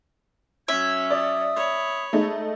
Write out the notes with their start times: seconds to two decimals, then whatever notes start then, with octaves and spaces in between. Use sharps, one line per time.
0.68 F#3 C#4 E5 G#6
1.10 D5 D#6
1.56 C#5 B5
2.13 G#3 A3 D#4